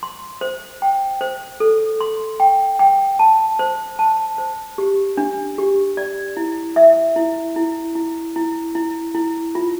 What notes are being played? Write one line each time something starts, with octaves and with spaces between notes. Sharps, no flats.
C6
C5
G5
C5
A4
C6
G5
G5
A5
C5
A5
C5
G4
D4
G4
D5
E4
E5
E4
E4
E4
E4
E4
E4
F4